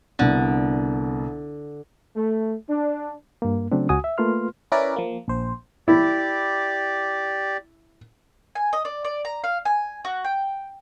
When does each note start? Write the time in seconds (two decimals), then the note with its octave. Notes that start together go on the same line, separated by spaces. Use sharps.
0.19 C2 D3 B3
2.16 A3
2.69 D4
3.42 G2 A#3
3.72 C#3 F#3 A3 C4 D4
3.89 C#2 F#4 G#5 D#6
4.04 E5
4.18 A3 A#3 F4 B4 C6 F6
4.72 C#4 E4 A#4 B4 D5
4.96 F3 A#3
5.28 A#1 C5
5.88 E4 G4 D5
8.55 G#5
8.73 D#5
8.85 D5
9.05 D5
9.25 A#5
9.44 F5
9.65 G#5
10.05 F#4
10.24 G5